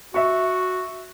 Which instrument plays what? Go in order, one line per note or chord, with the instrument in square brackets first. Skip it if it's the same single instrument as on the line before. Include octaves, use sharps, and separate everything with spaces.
[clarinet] F#4 [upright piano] E5 C#6